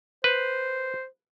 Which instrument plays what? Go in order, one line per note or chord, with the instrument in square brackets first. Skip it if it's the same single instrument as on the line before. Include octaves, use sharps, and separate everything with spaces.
[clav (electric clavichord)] B4 [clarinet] C5